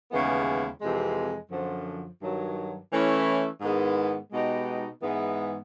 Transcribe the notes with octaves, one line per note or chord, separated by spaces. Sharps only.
D#2 C#3 E3 G#3 B3
F2 C3 E3 G#3
F#2 D3 F3
G2 D#3 F#3
E3 A3 C#4 E4
G#2 D#3 G#3 B3 E4
B2 G#3 B3 D#4 G4
G#2 E3 G#3 B3